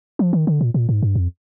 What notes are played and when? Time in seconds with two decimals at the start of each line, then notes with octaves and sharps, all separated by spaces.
0.19 F3
0.33 D#3
0.47 D3
0.61 A#2
0.74 A#2
0.89 G#2
1.03 G2
1.15 F2